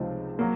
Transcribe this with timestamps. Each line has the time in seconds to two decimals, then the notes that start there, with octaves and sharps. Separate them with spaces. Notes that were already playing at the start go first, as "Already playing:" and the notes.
Already playing: C#2 C3 F3 C4 D#4
0.39 F#3 A#3